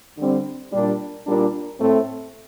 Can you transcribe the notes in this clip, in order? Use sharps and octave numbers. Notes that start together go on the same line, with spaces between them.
D3 G3 C4
A#2 G3 D4
A#2 G3 A#3 D4
A2 A3 C4